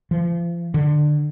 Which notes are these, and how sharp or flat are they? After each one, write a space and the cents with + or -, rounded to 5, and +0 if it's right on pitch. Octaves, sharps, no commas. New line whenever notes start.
F3 -35
D3 +20